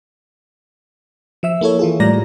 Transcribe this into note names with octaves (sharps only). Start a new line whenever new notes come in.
F3 E5 E6
A#3 E4 A4 C#5
E3 F4 G#4
A2 G3 D5 A#5 A#6